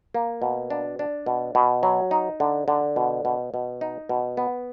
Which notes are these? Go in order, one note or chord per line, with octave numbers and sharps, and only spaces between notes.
A#3
B2
D4
D4
B2
B2
F#3
D#4
D3
D3
B2
B2
B2
D#4
B2
B3